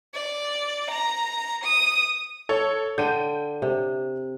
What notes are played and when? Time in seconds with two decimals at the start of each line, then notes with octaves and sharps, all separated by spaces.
0.14 D5
0.91 A#5
1.64 D#6
2.49 A4 C#5
2.98 D3 G5 G6 D#7
3.62 C3